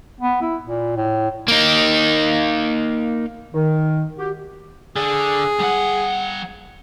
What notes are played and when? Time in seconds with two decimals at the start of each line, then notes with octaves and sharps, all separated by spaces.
0.20 B3
0.41 E4
0.63 A#2
0.96 A2
1.48 A#3 D#4
3.54 D#3
4.18 F#4 G4
4.96 D3 G#4
5.60 G3 F#5